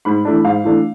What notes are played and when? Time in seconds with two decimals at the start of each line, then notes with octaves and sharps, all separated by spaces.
0.05 G#2 B5
0.25 E3 A3 D4
0.44 G#2 F5
0.64 E3 A3 D4